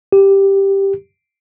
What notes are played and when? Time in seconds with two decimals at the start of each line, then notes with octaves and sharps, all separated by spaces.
0.12 G4